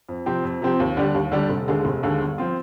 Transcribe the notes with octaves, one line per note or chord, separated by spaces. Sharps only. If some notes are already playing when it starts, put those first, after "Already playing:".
F2
C3 F3 C4 G4
F2
C3 F3 C4 G4
D#2
D3 G3 D4 G4
D#2
D3 G3 D4 G4
F1
D#2 D3 G#3
F1
D#2 D3 G#3
G1
F3 C4 F4